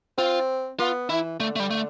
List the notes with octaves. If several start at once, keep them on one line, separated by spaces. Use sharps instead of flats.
C4 F4
B3 F4
E3 E4
D3 A3
A3
G3
A3